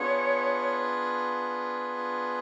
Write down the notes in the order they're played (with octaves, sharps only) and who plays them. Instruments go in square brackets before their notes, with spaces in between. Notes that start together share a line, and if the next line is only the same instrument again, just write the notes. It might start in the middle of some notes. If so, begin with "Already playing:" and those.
Already playing: [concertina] B3 D4 F4 G#4 [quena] C#5